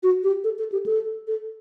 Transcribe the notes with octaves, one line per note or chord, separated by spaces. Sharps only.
F#4
G4
A4
A4
G4
A4
A4